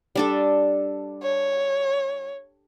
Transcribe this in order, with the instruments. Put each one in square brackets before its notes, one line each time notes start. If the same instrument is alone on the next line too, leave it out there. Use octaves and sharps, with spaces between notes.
[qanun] G3 D4 A4
[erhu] C#5